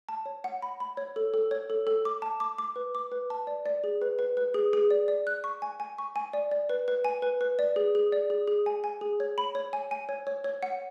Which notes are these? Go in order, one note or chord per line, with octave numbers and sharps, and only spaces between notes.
A5
C#5
F#5
B5
B5
C#5
A4
A4
C#5
A4
A4
D6
A5
D6
D6
B4
D6
B4
A5
D5
D5
G#4
B4
B4
B4
G#4
G#4
D5
D5
F#6
C#6
G#5
G#5
C#6
G#5
D5
D5
B4
B4
G#5
B4
B4
D5
G#4
G#4
D5
G#4
G#4
G#5
G#5
G#4
C#5
B5
C#5
G#5
G#5
C#5
C#5
C#5
F#5